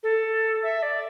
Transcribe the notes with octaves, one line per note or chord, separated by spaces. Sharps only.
A4
E5
D5